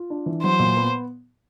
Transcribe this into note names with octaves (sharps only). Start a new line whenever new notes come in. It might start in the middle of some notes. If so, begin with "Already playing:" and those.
Already playing: F4
D4
E3
F#3 C5
A#2
B3